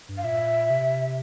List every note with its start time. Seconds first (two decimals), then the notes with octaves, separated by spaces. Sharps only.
0.09 G2
0.18 F5
0.24 A#2 E5
0.70 C3